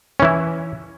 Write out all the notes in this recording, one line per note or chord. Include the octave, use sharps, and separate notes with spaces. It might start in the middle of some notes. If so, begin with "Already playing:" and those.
E3 C#4 E4